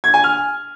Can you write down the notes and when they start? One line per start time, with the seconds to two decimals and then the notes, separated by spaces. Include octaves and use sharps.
0.04 G#6
0.14 G#5
0.24 F6